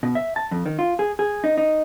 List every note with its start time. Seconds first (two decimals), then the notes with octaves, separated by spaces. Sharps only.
0.03 B2
0.15 E5
0.36 A5
0.51 F2
0.66 D#3
0.79 F4
0.99 G#4
1.19 G#4
1.44 D#4
1.58 D#4